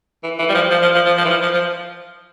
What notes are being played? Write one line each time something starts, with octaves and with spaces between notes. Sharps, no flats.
E3
E3
G3
F3
F3
F3
F3
F3
F3
E3
F3
F3
F3